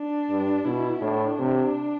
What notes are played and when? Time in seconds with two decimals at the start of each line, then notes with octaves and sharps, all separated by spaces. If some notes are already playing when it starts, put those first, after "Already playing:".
Already playing: D4
0.30 G2
0.65 B2 E4
1.02 A2 D4
1.39 C3